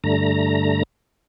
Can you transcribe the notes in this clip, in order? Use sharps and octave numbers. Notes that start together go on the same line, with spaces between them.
G2 D3 A3 A#5